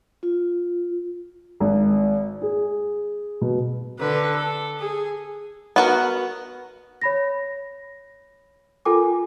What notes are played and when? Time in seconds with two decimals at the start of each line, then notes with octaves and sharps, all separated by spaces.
0.23 F4
1.60 G#1
2.42 G#4
3.41 B2
3.99 D3 B4
4.36 A4
4.79 G#4
5.76 B3 F#4 A#4
7.02 C#5 B5 A#6
8.85 F4 A4 A#4 G5 G#5 D6